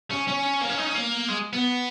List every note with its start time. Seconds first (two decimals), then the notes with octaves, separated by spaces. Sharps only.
0.11 C#4
0.28 C#4
0.61 A#3
0.69 C#4
0.78 D#4
0.86 C#4
0.95 A#3
1.28 G#3
1.53 B3